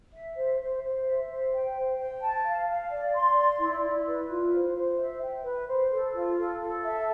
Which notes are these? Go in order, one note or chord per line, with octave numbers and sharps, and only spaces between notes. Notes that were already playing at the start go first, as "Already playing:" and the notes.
E5
C5
C5
C5
E5
C5
G5
C5
G5
A5
F5
F5
D5
C6
D5
E4
E4
B4
F4
C5
C5
E5
G5
B4
C5
A4
F4
A4
A4
E5